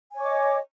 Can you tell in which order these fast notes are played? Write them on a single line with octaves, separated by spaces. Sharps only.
G#5 C#5 D6 D#5